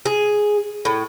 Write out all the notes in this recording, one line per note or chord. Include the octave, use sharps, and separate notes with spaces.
G#4
A2